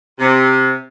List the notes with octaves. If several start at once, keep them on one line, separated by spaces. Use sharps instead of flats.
C3